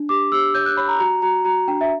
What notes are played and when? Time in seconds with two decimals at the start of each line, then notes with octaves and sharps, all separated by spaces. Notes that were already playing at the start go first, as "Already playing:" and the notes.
Already playing: D4
0.09 G4 D6
0.32 G4 E6
0.54 C#5 G6
0.66 F#6
0.77 C#5 B5
0.88 A#5
0.99 F#4 A#5
1.22 F#4 A#5
1.45 F#4 A#5
1.68 D4 G5
1.81 E5